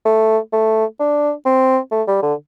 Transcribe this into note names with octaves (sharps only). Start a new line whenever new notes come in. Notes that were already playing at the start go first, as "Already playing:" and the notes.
A3
A3
D4
C4
A3
G3
D3